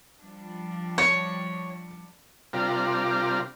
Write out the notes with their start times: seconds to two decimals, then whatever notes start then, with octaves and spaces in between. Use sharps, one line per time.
0.19 F3 G3 D4
0.98 C#5 C#7
2.53 C3 G3 D4 F4 A#4